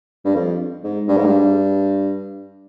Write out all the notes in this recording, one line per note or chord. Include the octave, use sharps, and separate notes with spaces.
G2
F2
G#2
G2
G#2
G2